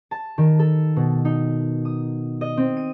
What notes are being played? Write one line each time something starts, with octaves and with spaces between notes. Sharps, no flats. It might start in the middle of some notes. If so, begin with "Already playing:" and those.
A5
D#3
A4
B2
D#4
D#6
D#5
C4
D#7